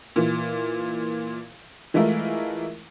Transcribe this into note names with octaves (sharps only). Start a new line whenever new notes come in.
A#2 E3
E3 G#3 A3 E4 F4 A#4